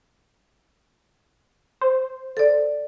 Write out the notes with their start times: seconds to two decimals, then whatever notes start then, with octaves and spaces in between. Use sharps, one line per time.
1.81 C5
2.37 A4 D5